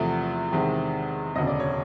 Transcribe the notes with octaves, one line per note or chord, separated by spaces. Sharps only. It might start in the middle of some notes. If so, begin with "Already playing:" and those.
Already playing: E2 C3 F3 A3
E2 C3 D#3 G#3
E1 D2 C#3 D#5
D5
C#5